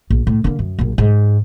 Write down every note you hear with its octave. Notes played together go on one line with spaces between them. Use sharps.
A#1
A2
D3 A#3
F#2
A#1 F#2
G#2